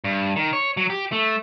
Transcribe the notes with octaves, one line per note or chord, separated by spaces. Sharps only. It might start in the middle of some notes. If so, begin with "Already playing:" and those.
G2
D#3
C#5
F#3
G4
A3